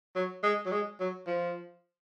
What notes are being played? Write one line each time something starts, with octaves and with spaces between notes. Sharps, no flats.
F#3
G#3
F#3
G#3
F#3
F3